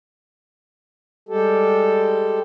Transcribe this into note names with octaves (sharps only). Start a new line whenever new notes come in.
G3 G#3 G4 A4